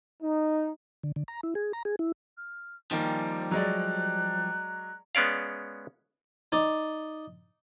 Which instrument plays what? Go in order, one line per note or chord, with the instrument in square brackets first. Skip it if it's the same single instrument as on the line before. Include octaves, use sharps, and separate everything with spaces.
[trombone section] D#4
[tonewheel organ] D3
D3
A#5
E4
G#4
A#5
G#4
E4
[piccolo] F6
[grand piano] D#3 A#3 [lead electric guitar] F3 G3 [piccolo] G#5
[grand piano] F#3 G#3 D5 [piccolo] F#6
[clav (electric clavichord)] G#3 B3 C#4 D5 F5
[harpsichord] D#4 D5